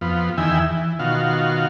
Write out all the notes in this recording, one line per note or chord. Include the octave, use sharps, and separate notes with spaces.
F2 B3 F4
E2 D#3 E4 E5 G5 G#5
E3
B2 D#3 F4 F#4 F5